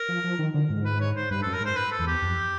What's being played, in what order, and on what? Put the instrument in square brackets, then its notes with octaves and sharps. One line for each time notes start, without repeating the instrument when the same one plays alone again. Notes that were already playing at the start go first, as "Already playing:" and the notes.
Already playing: [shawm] A#4
[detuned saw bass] F3
F3
D#3
D3
G#2
[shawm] B4
C#5
C5
[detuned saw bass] G2 [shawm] B4
[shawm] A4
[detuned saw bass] F#2
[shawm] A#4
[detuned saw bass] G#2 [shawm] C5
[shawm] B4
A4
[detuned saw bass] E2
[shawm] G4
[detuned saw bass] F2